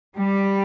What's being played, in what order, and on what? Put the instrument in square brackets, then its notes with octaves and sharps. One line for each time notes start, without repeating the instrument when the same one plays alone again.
[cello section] G3